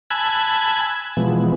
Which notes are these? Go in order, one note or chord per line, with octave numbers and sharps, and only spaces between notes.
G#5 A5 B5 E6 F#6 G#6
B2 E3 F3 G#3 B3